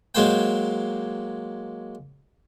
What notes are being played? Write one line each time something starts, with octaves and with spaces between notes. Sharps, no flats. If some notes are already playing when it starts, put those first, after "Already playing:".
F#3 G#3 A#3 C5 G5